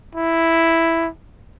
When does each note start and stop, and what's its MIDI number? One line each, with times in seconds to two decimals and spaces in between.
0.15 1.09 64